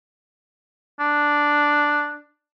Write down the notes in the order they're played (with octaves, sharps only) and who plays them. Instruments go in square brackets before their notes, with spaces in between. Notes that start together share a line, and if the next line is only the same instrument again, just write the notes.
[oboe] D4